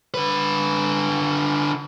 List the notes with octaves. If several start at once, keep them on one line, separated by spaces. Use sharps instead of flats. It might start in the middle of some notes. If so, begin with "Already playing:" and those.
D3 B4